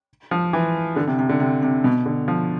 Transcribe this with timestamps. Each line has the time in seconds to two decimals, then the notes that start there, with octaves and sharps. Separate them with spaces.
0.31 F3
0.53 E3
0.96 D3
1.07 C3
1.19 C3
1.29 D3
1.40 C3
1.63 C3
1.84 B2
2.06 D3
2.28 F3